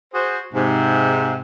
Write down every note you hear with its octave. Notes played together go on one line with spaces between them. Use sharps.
F#4 G#4 C5
G#2 C3